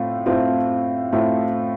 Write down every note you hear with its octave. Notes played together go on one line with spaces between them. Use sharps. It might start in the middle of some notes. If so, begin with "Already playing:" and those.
Already playing: A2 A3 C4 F4
A2 A3 C4 F4
A2 A3 C4 F4